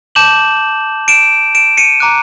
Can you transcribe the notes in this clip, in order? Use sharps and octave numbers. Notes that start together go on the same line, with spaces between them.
A5 D6 G6 E7 F#7
D7 E7
D7 E7
C#7 D#7
A#5 D6 F#6